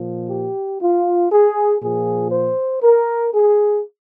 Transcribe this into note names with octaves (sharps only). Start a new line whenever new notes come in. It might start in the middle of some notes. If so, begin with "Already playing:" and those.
Already playing: A#2 F3
G4
F4
G#4
A#2 F3 G#4
C5
A#4
G#4